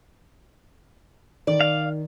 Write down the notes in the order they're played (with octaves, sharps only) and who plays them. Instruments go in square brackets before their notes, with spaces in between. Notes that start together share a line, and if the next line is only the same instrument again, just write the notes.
[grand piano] D#3 [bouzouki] D5
[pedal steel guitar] F5